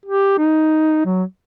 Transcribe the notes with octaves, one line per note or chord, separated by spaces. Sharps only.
G4
D#4
F#3